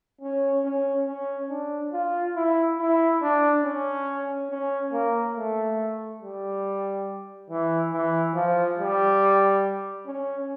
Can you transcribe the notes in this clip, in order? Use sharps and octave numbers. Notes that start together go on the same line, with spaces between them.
C#4
C#4
C#4
D4
F4
E4
E4
D4
C#4
C#4
A#3
A3
G3
E3
E3
F3
G3
C#4